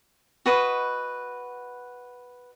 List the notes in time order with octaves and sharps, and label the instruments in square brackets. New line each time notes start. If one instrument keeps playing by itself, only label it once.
[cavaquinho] F#4 B4 D#5 B5